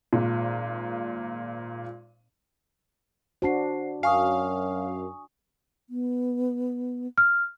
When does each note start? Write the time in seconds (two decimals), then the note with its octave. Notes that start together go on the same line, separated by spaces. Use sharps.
0.13 G#1 A#2
3.42 D4 F#4 C5 A5 C7
4.03 F#2 F5 G#5 C#6 D#6
5.89 B3
7.18 F6